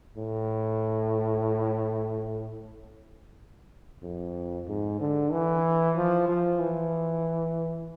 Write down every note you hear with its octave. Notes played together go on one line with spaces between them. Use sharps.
A2
F2
G#2
D3
E3
F3
F3
E3